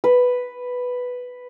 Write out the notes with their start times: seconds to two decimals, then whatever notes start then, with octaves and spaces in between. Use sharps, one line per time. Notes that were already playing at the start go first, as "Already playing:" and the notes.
0.04 B4